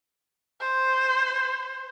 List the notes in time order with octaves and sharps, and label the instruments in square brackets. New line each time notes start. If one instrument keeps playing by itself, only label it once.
[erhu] C5